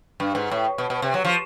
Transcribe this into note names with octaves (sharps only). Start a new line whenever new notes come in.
G2
G#2
A2
B2
B2
C3
F#3
F3